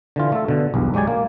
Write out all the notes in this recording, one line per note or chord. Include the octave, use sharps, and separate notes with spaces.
D3 E3 F4
A3 A4
B2 D3
B1 E2 G2
F#3 G#3 G4 D5 G#5
A#3